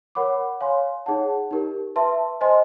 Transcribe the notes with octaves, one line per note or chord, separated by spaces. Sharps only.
A#4 C#5 F#5 B5 D6
C#5 F5 G#5 C6
D#4 G#4 C#5 F#5 A5
D#4 G4 A#4
B4 E5 A5 C6
C5 D#5 G#5 C6